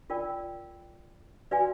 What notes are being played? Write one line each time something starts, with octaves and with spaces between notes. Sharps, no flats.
F4 A#4 D5 G5
F#4 B4 D5 F5 G#5